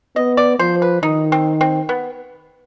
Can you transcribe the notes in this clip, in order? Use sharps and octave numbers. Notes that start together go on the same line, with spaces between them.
B3 D#5
D5
F3 C5
B4
D#3 D#4
C4
C4
B3